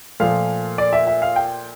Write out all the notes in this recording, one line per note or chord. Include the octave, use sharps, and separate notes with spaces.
A#2 F3 A3 F5
D5
E5
E5
F5
G5